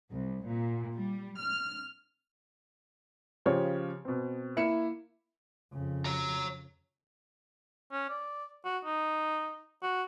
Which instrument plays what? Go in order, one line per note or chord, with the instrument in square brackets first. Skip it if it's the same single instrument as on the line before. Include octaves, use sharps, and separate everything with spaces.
[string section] C2
A#2
G3
F6
[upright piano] C#3 F3 G4 C#5
B2 C4
A#3 E4 C#7 E7
[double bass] F2 C#3
[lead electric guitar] C#5 A#5
[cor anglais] C#4
D5
F#4
D#4
F#4